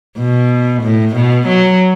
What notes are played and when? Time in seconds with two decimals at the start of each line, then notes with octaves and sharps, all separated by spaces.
0.18 B2
0.83 A2
1.16 B2
1.48 F#3